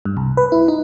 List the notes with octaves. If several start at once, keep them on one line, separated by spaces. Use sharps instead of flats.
G2
C2
B4
E4
D#4